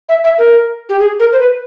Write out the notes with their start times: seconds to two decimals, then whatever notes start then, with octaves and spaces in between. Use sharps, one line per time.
0.09 E5
0.24 E5
0.38 A#4
0.89 G4
0.99 G#4
1.20 A#4
1.32 C5
1.40 B4